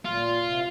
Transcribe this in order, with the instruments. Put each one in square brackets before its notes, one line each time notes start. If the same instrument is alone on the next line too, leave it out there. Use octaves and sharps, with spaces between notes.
[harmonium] A#2 [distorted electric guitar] F4
[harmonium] C3